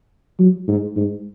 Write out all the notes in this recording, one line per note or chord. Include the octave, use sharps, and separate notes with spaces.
F#3
G#2
G#2